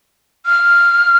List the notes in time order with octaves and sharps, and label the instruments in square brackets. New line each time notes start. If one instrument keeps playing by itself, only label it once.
[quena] F6